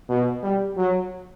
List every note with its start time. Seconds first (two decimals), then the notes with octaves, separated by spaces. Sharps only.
0.09 B2
0.43 G3
0.77 F#3